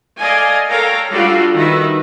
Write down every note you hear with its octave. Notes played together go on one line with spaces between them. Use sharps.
A4 D5 D#5 F5 G#5
A4 A#4 C#5 F5 G5 A#5
G3 D4 F4 F#4 A4 F5
D#3 F#4 B4 E5